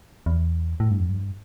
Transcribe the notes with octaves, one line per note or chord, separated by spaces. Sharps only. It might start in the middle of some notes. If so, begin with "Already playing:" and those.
E2
A2
G2
F2
G2